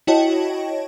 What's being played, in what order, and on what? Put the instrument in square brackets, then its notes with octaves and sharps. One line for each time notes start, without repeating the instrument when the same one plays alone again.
[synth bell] E4 F#4 C#5 D#5 G5 A5